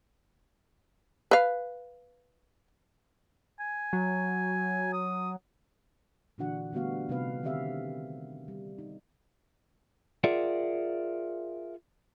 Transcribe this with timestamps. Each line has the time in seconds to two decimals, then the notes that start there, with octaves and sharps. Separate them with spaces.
1.31 B4 F5
3.60 G#5
3.93 F#3
4.93 D#6
6.38 A#2 D3 E3 D4 F#4 F#5
6.73 D3 G3 A3 B3 F#4 F5
7.09 C3 G3 B3 D#4 B4 F5
7.43 D3 D#3 C4 G4 E5 F5
8.48 G3
8.78 D#4
10.24 F4 G#4 A#4 D5 E5 F#5